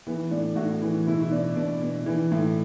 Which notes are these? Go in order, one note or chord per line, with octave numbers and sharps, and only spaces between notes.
E3 B3
A2 D4
A2 F#4
E3
B2 E4
E4
B2 D4
B2 D4
B2
E3
A2